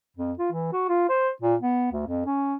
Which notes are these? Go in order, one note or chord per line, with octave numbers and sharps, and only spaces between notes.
F2
F4
E3
F#4
F4
C5
A#2
B3
D2
F2
C#4